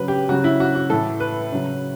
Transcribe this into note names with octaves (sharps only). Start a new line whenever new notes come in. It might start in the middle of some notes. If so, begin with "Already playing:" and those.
Already playing: C#3 F#3 B4
G4
C#3 F#3 F#4
E4
F#4
F#4
A2 E3 A4
B4
C#3 F#3